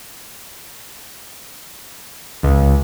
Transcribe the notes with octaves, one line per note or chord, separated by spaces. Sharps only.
C#2